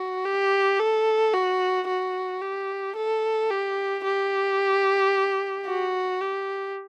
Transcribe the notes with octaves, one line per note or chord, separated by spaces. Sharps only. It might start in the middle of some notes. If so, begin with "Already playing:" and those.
Already playing: F#4
G4
A4
F#4
F#4
G4
A4
G4
G4
F#4
G4